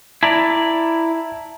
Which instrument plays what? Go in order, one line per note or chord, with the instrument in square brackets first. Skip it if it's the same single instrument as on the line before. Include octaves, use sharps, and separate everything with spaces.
[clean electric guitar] E4 D5 [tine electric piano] A5 A#5